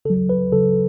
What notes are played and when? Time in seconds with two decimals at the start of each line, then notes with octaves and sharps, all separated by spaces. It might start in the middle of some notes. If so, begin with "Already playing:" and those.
0.05 C#3 A4
0.10 F#3
0.29 B4
0.52 C#3 F#3 A4